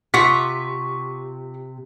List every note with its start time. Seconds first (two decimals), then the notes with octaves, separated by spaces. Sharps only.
0.14 C3 F4 G4 F#5 C#6 B6